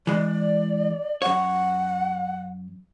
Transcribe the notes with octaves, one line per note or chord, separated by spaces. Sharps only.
E3 G#3 D5
F#2 C#5 F#5